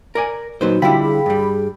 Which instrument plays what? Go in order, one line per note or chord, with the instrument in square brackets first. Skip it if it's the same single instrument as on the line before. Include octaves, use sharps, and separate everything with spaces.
[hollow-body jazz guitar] A#4 D5 G#5
[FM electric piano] A#2 D#3 [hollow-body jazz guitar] F#3 B4 C5 [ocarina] F#4
[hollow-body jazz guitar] D3 G3 E4 [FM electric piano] F4 G4 B5
[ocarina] G#4
[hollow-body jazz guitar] G2 G3